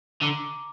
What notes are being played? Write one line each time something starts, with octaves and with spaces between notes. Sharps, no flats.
D3 A#5 D6